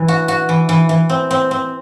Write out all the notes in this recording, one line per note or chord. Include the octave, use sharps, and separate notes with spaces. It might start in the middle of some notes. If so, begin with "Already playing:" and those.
Already playing: E3
F#4
F#4
E3
E3
E3
C4
C4
C4